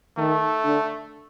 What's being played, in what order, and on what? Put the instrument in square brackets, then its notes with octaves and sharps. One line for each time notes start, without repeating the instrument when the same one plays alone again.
[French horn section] D#3 [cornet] A3
[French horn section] D3